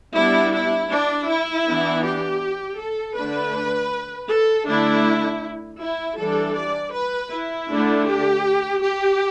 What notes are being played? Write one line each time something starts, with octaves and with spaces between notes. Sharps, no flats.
G3 B3 D4 E4
E4
D4
E4
E3 B3 D4
G4
A4
D3 A3 D4 B4
A4
D3 A3 D4 E4
E4
E3 G3 D4 A4
D5
B4
E4
D3 A3 D4
G4
G4